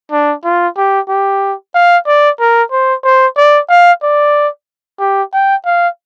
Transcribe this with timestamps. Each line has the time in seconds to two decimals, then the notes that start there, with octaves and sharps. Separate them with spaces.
0.12 D4
0.45 F4
0.77 G4
1.09 G4
1.75 F5
2.07 D5
2.40 A#4
2.72 C5
3.04 C5
3.37 D5
3.69 F5
4.03 D5
5.00 G4
5.33 G5
5.66 F5